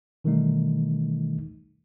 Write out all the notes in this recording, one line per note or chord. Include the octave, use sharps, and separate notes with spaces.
B2 D#3 E3 G3 A3 D#4